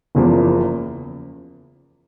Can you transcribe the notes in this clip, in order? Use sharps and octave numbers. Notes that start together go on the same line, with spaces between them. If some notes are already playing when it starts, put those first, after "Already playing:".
F#1 E2 C#3 F3 A#3